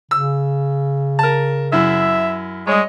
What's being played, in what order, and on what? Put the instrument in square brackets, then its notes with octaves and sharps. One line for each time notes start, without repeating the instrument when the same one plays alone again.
[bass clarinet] C#3 [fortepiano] E6
[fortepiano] A#4 A5
[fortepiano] F#2 E4 [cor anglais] E5
[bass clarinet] G3 [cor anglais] G#3 [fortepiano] C#5 D#5